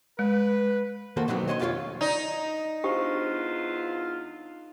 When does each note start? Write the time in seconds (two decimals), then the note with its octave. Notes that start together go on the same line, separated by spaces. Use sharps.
0.19 G#3 B4
1.17 D#3 A#3 F#4 A4 C5
1.28 B2 D3 D#3 F#3 B3 C4
1.48 C5 C#5 D#5 F#5 C6
1.59 F2 A3 F4 G4 C#5 F5
2.01 D#4 D5
2.84 E2 D4 F4 G4 C5